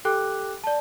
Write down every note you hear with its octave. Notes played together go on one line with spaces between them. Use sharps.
G4 A4 G5 D6 F#6
D5 A5